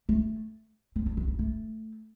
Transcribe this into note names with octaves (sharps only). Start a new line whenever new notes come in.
A3
C4
D4
D4
B3
A3